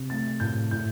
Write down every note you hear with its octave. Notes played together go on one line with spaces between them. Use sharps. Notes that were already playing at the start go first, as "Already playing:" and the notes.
Already playing: C3
A3 A6
A2 G6
A2 G6